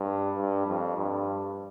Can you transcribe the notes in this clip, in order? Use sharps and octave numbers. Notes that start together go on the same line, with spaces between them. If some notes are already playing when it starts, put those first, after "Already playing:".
Already playing: G2
G2
F2
G2